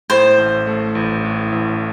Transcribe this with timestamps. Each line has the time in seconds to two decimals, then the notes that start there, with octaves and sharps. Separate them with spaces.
0.10 A2 C5
0.38 A1
0.67 A3
0.95 A1
1.25 A2
1.52 A1